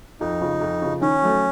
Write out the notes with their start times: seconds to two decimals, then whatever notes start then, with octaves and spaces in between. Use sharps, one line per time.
0.20 F2 D#4
0.41 C#3 F3
0.61 F2
0.82 C#3 F3
1.01 D#3 C#4
1.22 F#3 A3